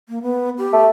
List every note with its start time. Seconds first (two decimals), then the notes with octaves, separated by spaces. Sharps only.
0.09 A#3
0.22 B3
0.58 G4
0.72 A3